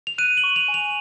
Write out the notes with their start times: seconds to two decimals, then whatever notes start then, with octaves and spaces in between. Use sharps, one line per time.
0.07 F7
0.18 F#6 D#7
0.37 F#7
0.44 C#6
0.56 F7
0.68 G#5
0.74 F7